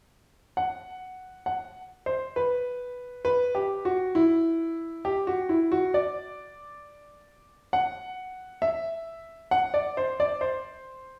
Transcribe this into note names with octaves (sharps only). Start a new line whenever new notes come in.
F#5
F#5
C5
B4
B4
G4
F#4
E4
G4
F#4
E4
F#4
D5
F#5
E5
F#5
D5
C5
D5
C5